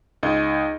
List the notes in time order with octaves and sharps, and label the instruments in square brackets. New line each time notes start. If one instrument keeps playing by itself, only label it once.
[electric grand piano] C#2 D#4 D#5